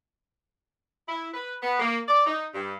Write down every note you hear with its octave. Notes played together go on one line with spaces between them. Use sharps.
E4
B4
B3
A#3
D5
D#4
G2